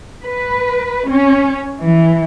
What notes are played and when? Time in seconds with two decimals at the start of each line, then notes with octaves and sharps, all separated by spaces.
0.23 B4
1.08 C#4
1.80 E3